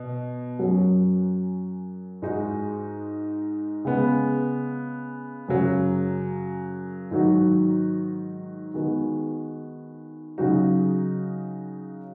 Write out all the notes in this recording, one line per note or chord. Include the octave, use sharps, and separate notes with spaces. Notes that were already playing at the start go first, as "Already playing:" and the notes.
Already playing: B2
F#2 F#3 C#4 F#4
G#2 G#3 D#4 F#4
C#3 G#3 B3
F#2 C#3 F#3
G#2 D#3 F#3 D#4 F#4
D#3 G#3 B3 F#4
C#3 F#3 D#4 F#4